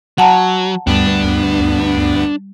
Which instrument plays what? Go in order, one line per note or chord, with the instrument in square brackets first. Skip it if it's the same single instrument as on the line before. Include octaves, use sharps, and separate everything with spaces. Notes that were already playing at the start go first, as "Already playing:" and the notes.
[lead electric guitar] F#3 [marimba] F#5 A5 A#5
[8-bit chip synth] D2 G2 B3 [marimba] G3 [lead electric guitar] D4